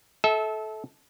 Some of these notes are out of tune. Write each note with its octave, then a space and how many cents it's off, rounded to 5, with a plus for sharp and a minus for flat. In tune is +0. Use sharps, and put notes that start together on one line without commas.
A4 -20 E5 -30